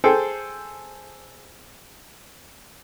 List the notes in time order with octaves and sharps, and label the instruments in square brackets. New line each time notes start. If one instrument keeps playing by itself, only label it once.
[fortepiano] G#4 A4 C5 G5